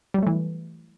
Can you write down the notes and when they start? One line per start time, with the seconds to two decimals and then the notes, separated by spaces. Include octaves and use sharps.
0.14 G3
0.18 F#3
0.23 A3
0.27 E3